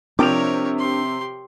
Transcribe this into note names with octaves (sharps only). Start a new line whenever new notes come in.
C3 F3 D4 A#4 C#5 G5 D6 F7
G4 C6